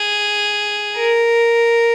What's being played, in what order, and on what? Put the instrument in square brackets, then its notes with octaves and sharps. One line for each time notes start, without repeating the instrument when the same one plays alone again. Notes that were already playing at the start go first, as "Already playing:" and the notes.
Already playing: [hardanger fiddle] G#4
A#4